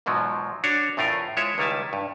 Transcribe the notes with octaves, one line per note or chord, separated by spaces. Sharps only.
E2 G#2 B2 F3 F#3
D4 F#4 C#5
E2 A2 A3 F4 A#4
G#3 E4 F4 C5 C#5 E5
C#2 D#3 G3 E4 G#5 A5
G2